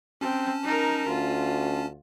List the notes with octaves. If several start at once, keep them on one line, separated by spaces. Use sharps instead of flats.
C4 C#4 G5 A5
D#4 A#4
D2 F4